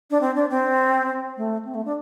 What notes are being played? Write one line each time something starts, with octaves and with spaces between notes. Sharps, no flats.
D4
C4
D4
C4
A3
C4
A3
D4